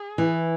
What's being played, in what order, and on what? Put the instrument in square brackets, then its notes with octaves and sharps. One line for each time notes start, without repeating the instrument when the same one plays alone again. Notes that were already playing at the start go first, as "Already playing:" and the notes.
Already playing: [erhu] G#4
[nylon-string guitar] E3